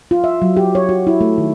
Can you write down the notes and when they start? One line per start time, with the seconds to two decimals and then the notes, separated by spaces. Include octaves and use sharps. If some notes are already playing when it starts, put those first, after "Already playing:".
0.11 F4
0.24 E5
0.42 F#3
0.57 G4
0.75 C#5
0.89 F#4
1.07 E4
1.21 A3
1.38 D#3